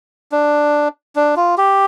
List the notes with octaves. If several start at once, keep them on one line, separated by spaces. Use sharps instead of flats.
D4
D4
F4
G4